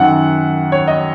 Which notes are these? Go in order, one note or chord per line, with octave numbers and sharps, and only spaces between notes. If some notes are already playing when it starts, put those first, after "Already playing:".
Already playing: F#2 D#3 F#5
C#5
D#5